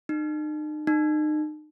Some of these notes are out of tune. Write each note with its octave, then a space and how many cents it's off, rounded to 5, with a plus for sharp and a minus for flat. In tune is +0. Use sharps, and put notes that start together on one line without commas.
D#4 -40
D#4 -35